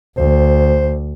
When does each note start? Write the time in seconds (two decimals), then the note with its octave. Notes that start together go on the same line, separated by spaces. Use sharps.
0.18 D2 C5